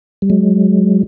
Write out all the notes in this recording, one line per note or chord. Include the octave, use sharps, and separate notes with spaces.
G3
F#3 G#3